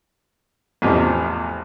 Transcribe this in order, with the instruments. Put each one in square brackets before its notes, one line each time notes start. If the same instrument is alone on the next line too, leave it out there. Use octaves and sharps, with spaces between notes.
[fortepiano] A1 E2 C3 F3